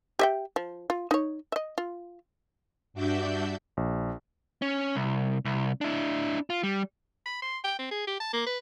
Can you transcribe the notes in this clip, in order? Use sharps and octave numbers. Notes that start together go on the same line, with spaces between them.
G4 E5 G5
F3
F4
D#4 C#5
D#5 E5
F4
G2 D4 F#4 D5 E5 G6
A#1
C#4
C2
C2
D4 E4
F4
G3
B5
C6
G5
C4
G#4
G4
A5
A#3
B4